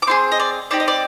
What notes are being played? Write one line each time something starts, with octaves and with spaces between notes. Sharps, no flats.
D6
C4 F4 G#4 C6
D#5
D5
C4 D#4 G4 D5
D#5
D5